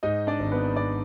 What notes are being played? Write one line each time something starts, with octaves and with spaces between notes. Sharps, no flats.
G#2 D#4 D#5
D4 D5
G#1
B3 B4
G#1 D4 D5